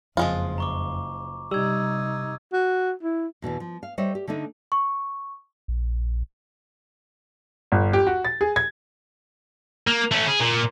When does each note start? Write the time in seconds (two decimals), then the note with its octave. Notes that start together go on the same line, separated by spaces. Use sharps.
0.17 F#1 F2 F3 G#3 F4
0.58 A#5 C#6 D6
1.51 C3 G3 D#4 E6 G#6
2.53 F#4
3.03 E4
3.42 E2 B2 D3 E3
3.60 F3
3.83 F5
3.98 G3 C5 C#5 D#5 E5
4.15 G4
4.27 D3 A3 D4 D#4
4.72 C#6
5.68 A#1
7.72 G1
7.93 G4
8.07 F#4
8.25 A6
8.41 G#4
8.56 G#6
9.87 A#3
10.11 A3 C#4
10.27 G#4
10.40 A#2